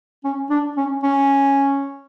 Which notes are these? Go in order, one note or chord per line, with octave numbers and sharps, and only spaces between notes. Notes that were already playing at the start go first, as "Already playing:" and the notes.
C#4
D4
C#4
C#4